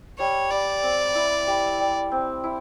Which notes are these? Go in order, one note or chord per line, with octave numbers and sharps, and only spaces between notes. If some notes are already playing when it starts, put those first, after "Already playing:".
G3 C#5
G3 D5
C4
E4
G3
G3
C4
E4